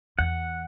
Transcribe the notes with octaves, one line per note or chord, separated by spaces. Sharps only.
E2 F#5